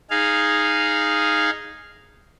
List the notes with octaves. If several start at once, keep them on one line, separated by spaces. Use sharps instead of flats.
D#4 G#4 F5